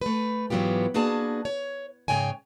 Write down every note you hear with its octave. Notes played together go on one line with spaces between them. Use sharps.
A3 B4
G#2 E3 F#3 B3 F4 G4
A#3 D4 F#4 G#4 B4 A5
C#5
G#2 C#3 C#5 G5 G#5